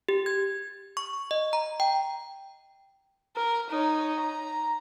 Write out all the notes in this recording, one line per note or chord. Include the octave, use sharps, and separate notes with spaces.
G4
G#6
C#6
D#5
A#5
G5
A#4
D#4 C#5
A#5